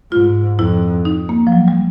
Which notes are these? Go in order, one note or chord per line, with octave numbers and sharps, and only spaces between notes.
G#2 F4
F2 E4
D#4
A#3
F3
F#3
G3